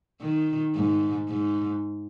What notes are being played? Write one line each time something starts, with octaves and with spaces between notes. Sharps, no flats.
D#3
G#2
G#2